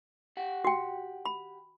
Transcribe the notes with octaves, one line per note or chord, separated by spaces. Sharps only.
G4 F#5
F#4 G5
B5